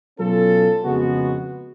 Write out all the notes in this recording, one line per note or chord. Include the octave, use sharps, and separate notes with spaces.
B2 F#3 C#4 F4 A4
F2 C#3 G#3 B3 F#4